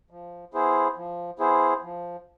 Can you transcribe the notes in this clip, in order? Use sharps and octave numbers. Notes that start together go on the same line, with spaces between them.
F3
B3 E4 G#4 C5
F3
B3 E4 G#4 C5
F3